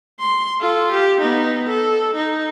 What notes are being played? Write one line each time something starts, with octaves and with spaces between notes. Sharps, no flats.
C6
F4 A4
G4
B3 D#4
A4
D#4